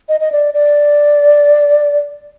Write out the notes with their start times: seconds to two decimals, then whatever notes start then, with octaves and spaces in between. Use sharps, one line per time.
0.09 D#5
0.20 D#5
0.32 D5
0.54 D5